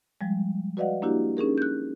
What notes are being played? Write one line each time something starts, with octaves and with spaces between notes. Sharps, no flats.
F3 G3 G#3
F#4 B4 D5 D#5 F5 F#5
A#3 D4 E4 F#4 G4
C#4 D#4 G#4 A#4
F#6 G6